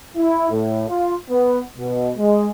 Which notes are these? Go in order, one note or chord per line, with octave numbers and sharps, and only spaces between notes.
E4
A2
F4
B3
B2
G#3